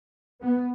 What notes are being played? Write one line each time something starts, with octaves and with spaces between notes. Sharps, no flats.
B3